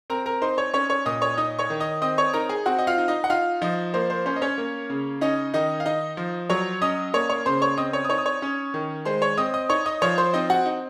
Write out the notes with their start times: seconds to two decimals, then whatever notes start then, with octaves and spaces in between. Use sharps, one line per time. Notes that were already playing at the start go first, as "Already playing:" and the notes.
0.10 C4 A#4 A#5
0.26 A#4 A#5
0.42 D#4 C5 C6
0.58 C#5 C#6
0.73 C#4 C#5 C#6
0.90 C#5 C#6
1.06 A#2 D#5 D#6
1.21 C#5 C#6
1.37 D#4 D#5 D#6
1.59 C#5 C#6
1.70 D#3
1.80 D#5 D#6
2.02 C4 D#5 D#6
2.18 C#5 C#6
2.34 D#4 A#4 A#5
2.49 G#4 G#5
2.66 C4 F#4 F#5
2.79 D#5
2.87 F4 F5
2.98 D#4
3.08 D#4 D#5
3.24 F#5
3.30 D#4 F4 F5
3.61 F3 D#4 D#5
3.94 A#3 C5
4.10 C5
4.26 C#4 C5
4.36 D#5
4.42 C#4 C#5
4.58 A#3
4.90 C#3
5.21 C#4 D#4 D#5
5.54 D#3 D#4 D#5
5.80 F5
5.86 D#4 D#5
6.17 F3
6.50 F#3 C#5 C#6
6.81 C#4 D#5 D#6
7.14 A#3 C#5 C#6
7.30 C#5 C#6
7.46 C#3 C5 C6
7.62 C#5 C#6
7.78 C4 D#5 D#6
7.93 C#5 C#6
8.05 D#6
8.09 D#4 C#5 C#6
8.18 D#6
8.26 C#5 C#6
8.42 C#4
8.74 D#3
9.05 G#3 C5 C6
9.22 C#5 C#6
9.37 C4 D#5 D#6
9.54 D#5 D#6
9.69 D#4 C#5 C#6
9.86 D#5 D#6
10.02 F3 C#5 C#6
10.18 C5 C6
10.34 C4 D#4 D#5
10.50 F#4 F#5
10.66 D#4